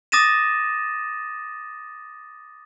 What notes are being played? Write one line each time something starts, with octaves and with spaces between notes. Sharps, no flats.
D6 D#6 A6 A#6 D#7 E7